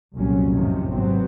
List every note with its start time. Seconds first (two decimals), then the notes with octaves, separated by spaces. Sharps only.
0.15 F1 C2 F2 A#2 F#3 C#4
0.53 F#2 A2 C3 D#3 F3
0.87 G#1 F#3 B3 C4